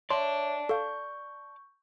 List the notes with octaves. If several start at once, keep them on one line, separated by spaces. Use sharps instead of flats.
C#5 D5 E5 A5 C6
A4 F5 C#6 G6